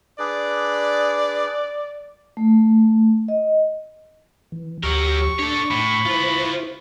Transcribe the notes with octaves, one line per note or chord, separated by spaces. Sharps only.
D4 G#4 B4 D5
A3
D#5
E3
D2 F#3 G4 A#4 C#6 E6
D4 A4 C#5 D6
A2 B5
E4 F4 B4 C5